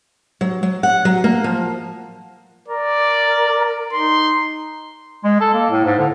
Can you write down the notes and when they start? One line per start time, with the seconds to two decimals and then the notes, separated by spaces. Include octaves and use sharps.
0.41 F#3
0.63 F#3
0.83 F#5
1.05 F#3
1.24 A#3
1.44 F3
2.68 A#4 D5
3.93 D#4 C6
5.24 G#3
5.40 A4
5.54 A#3
5.70 A2
5.85 G#2
5.99 D3